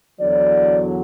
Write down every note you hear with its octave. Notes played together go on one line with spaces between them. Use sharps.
E2 D3 F#3 D5